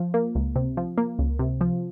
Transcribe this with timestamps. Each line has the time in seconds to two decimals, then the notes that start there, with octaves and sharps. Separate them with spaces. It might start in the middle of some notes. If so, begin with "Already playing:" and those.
Already playing: F3
0.14 A#3
0.35 C#2
0.56 C3
0.77 F3
0.98 A#3
1.19 C#2
1.39 C3
1.61 F3